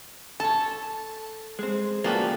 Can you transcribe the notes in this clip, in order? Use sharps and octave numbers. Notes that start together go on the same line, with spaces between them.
A4 C#5 A5
G#3 C4
C#3 F3 G3 A#3 F#4 A4 B4